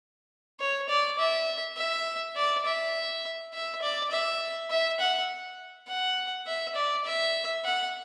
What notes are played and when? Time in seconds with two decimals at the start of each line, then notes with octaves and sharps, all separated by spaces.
0.60 C#5
0.89 D5
1.19 E5
1.77 E5
2.36 D5
2.66 E5
3.54 E5
3.82 D5
4.11 E5
4.70 E5
5.00 F#5
5.88 F#5
6.47 E5
6.75 D5
7.05 E5
7.64 F#5